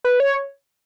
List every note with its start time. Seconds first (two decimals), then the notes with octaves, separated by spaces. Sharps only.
0.04 B4
0.20 C#5